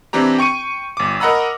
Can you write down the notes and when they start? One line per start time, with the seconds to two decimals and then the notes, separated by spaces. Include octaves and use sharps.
0.13 E3 C4 D4 G4 A#5
0.38 G5 C#6 C#7 D#7
0.97 G1 D6
1.20 A#4 D#5 F#5 A#5 B5 E6